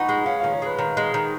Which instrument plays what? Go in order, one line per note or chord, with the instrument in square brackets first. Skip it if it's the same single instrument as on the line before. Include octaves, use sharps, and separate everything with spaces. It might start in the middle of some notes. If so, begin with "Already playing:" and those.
Already playing: [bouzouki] D#4 [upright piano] F#5 B5 C#6
[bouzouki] G#3
[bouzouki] C#4 [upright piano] F5
[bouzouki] D#3 [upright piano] F5
[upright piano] C#5
[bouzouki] G#3 [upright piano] B4
[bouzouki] D#3
G#3
D#3